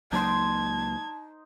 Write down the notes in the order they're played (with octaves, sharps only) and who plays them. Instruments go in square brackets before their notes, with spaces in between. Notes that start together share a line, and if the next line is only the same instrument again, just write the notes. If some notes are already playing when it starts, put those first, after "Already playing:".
[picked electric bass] C#2 F#3 A#3 [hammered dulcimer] D#4 D#5 C6 [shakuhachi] A5 [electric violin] G#6